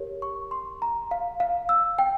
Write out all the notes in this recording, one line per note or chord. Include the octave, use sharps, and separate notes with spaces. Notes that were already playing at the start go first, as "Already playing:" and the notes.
Already playing: G4 A#4 C#5
C#6
C6
A#5
F5
F5
E6
G5